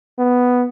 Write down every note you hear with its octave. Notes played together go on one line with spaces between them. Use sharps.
B3